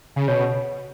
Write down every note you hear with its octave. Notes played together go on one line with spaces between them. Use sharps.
C#3
B2 C#5